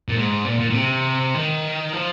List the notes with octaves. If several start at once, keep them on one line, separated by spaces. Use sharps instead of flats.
A#2
G#2
A#2
A#2
A#2
C3
D#3
F3